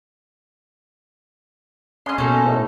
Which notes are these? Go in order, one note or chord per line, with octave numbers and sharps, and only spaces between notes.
C#4 D#5 C6
B2 A#3 D#4 A4
A2